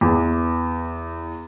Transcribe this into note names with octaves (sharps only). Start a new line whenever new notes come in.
E2